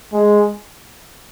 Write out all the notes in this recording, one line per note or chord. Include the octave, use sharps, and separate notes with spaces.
G#3